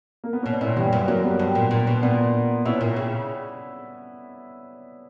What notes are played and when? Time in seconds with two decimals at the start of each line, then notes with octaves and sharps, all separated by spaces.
0.24 A#3
0.33 B3
0.43 B2 C#4
0.52 D4
0.61 A#2 C#4 E4
0.77 G2 E3 G3
0.93 F#2
1.08 F#2 F#3 A#3
1.24 G3 B3
1.39 G2
1.55 A#2
1.71 A#2
1.87 B2
2.02 A#2 B3 D4
2.65 B2 C#4 E4
2.81 A#2
2.96 C#3